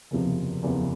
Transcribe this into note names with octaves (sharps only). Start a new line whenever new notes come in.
F#1 E2 C3 F3
F#1 E2 C3 F3